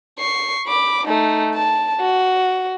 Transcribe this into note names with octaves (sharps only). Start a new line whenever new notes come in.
C#6 C7
B5 D6
A3 D#4
A5
F#4